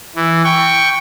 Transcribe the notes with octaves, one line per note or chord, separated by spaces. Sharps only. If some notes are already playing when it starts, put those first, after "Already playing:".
E3
G5 C#6